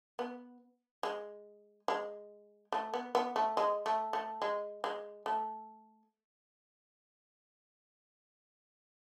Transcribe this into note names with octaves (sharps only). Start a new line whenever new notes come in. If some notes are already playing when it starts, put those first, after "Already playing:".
B3
G#3
G#3
A3
B3
B3
A3
G#3
A3
A3
G#3
G#3
A3